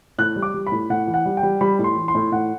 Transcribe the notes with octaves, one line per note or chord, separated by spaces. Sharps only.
A2 F#6
G3
D6
G3
B5
A2
A2 F#5
E3
F#5
G3
G5
G3
G3 B5
A2
C6
E3
C6
A2
A2 F#5